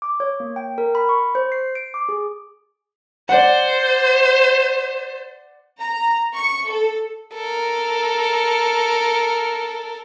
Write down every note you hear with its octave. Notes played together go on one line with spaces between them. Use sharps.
D6
C#5
A#3
G5
A#4
B5
C#6
C5
C7
D7
D6
G#4
C5 D5 F#5
A#5
C#6
A4
A4 A#4